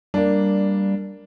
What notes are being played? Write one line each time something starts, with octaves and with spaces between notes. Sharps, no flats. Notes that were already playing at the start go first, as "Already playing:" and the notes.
G3 A#3 D4